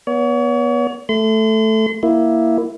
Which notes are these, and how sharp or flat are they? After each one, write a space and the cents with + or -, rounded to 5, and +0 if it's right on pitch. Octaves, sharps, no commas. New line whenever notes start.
B3 -25 C#5 +35
A3 +0 C6 -40
A#3 +0 E4 +0